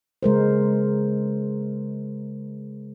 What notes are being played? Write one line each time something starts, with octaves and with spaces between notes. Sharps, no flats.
C#3 G#3 A#4 C5